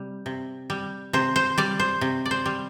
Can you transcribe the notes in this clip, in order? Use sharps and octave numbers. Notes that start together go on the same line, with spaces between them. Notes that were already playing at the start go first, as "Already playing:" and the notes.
Already playing: C3 G3
C3
G3
C3 C5
C5
G3 D5
C5
C3
D5
C5
G3